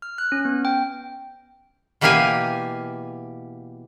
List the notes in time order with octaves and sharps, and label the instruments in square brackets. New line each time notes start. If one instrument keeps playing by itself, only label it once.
[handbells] F6
F#6
C#4
B3
G5
[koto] B2 E3 A#3 G4 F5 G#5